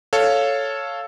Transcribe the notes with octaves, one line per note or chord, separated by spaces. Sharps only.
A4 C#5 F5